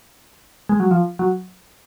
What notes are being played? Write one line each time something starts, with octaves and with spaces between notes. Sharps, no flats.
G#3
F#3
F3
F#3